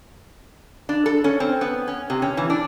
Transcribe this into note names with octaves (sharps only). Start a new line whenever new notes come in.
D4
A4
C#4
C4
B3
C#4
C3
C#4
E3
D4